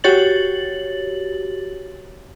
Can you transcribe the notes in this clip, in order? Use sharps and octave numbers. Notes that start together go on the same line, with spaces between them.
F#4 G4 C#5 A6 F#7